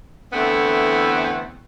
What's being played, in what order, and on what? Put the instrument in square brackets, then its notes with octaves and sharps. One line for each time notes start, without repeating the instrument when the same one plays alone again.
[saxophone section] E2 D3 E3 A3 B3 C4